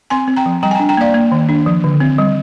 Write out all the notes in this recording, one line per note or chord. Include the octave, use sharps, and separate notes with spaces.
C4 G#5 C6
C4
G5 A#5
F3
G3 G5 A#5
G#5
D4 G5 A#5
G5 A#5
A#3 D5 F5
A#3
D#3
D4
F3
D3
C4
G3